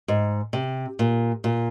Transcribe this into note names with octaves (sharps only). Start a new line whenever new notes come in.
G#2
C3
A#2
A#2